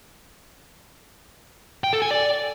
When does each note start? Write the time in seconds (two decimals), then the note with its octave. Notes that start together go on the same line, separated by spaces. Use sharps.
1.84 G5
1.93 A4
2.02 G#5
2.11 D5